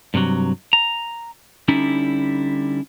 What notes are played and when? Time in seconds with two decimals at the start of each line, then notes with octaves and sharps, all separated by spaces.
0.14 G2 C3 D#3 F#3
0.73 A#5
1.68 D3 G3 C#4 D#4 E4